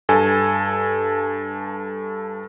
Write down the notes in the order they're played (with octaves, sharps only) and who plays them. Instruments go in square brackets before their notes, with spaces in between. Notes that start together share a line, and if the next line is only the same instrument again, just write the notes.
[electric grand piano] G2 A4 G#5